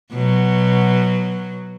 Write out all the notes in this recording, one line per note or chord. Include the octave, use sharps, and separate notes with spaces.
B2 F#3